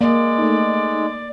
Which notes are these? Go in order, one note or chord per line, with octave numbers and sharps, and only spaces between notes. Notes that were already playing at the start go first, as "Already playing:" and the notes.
G#3 A#3 D5
A3 D#4